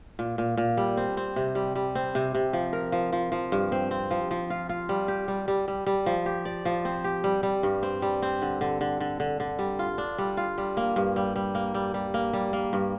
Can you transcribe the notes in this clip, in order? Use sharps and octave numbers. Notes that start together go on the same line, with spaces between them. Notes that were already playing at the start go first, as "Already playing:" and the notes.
A#2
A#2
A#2
G3
C4
C4
C3
G3
G3
C4
C3
C3
F3
A#4
F3
F3
F3
G2
C4
C4
F3
F3
F4
F4
G3
G4
G3
G3
G3
G3
F3
G4
D5
F3
C4
G4
G3
G3
G2
C4
G3
C4
D3
D3
D3
D3
D3
D3
G3
F4
D4
G3
F4
G3
A#3
G2
G3
G3
A#3
G3
G3
A#3
G3
A#3
G2